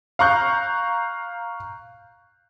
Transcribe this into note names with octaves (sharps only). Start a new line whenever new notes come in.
F5 A#5 C#6 F#6 G6